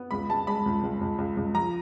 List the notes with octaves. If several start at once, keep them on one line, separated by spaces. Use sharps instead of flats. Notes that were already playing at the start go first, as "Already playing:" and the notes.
Already playing: B3
C#2 B5
G#3 A5
G#3 B5
C#2
C#2
C#2
C#2
C#2
F3 A#5